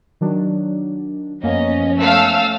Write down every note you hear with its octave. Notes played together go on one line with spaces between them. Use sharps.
D#3 F#3 D4
F#2 F3 A#3 B3 C#4 D#5
A3 F5 E6